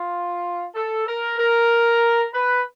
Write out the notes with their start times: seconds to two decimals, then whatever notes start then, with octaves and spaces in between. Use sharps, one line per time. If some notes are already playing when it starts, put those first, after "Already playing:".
Already playing: F4
0.75 A4
1.07 A#4
1.38 A#4
2.34 B4